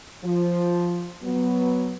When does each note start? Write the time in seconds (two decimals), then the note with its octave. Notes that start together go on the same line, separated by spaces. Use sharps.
0.24 F3
1.24 F#3 B3